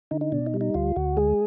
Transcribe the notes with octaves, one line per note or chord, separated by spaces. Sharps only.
D3 D#4
D#4
B2 D4
D#4
G3
D#4
D2 F4
D2 F#4
G#3 G#4